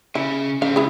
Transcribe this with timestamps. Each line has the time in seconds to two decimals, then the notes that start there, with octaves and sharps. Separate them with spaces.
0.15 C#3 E4
0.62 A2 C#3 C4 F5
0.76 C#2 E4 G#4